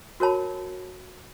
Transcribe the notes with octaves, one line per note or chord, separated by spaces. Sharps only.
F#4 A#4 C#5 A5 B5